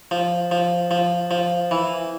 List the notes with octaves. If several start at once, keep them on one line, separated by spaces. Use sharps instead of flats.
F3
F3
F3
F3
E3